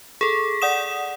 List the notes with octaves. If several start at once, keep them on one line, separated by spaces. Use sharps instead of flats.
G#4 A4
D5 F#5 D#6 E7